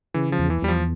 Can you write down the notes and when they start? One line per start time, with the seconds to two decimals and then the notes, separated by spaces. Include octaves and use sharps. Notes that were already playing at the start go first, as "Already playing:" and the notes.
0.14 C#3 E3
0.32 F3
0.38 E2
0.50 E3
0.62 E2 G3
0.68 F3